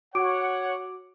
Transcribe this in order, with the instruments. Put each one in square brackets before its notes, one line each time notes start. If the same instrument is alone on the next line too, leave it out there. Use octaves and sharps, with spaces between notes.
[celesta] F#4 D6 D7 [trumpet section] C#5 F#5